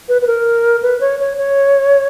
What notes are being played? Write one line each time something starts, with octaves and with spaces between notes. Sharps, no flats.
B4
B4
A#4
B4
C#5
C#5
C#5